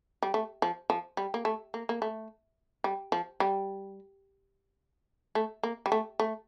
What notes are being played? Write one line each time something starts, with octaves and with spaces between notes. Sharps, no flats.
G3
A3
F3
F3
G3
A#3
A3
A#3
A#3
A3
G3
F3
G3
A3
A#3
G3
A3
A3